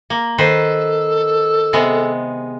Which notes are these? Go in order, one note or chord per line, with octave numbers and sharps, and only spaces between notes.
A#3
D#3 A4 B4 C5
C3 G#3 B3